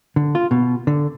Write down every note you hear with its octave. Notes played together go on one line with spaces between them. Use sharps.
D3
F4
B2
D3